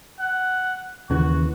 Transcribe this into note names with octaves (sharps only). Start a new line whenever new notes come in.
F#5
D#2 C#3 E3 F#4